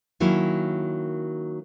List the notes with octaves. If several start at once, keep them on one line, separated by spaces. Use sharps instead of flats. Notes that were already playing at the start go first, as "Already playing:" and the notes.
D#3 F#3 A#3 C#4 E4